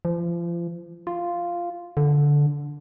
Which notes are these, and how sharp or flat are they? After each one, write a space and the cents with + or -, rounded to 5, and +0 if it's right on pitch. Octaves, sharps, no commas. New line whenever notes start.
F3 -35
F4 -5
D3 -10